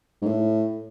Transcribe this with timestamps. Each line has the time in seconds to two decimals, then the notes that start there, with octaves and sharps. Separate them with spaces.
0.22 G#2
0.26 A2